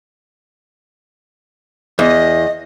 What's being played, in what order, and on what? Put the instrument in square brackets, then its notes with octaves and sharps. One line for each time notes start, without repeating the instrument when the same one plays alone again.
[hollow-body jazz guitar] E2 [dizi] D#5